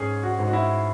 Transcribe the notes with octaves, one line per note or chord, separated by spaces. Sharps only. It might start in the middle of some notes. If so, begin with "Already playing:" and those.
Already playing: G#2 C#4 G#4
F#4
G#2
F#4
E4